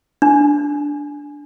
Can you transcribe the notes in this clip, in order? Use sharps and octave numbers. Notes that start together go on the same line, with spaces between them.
D4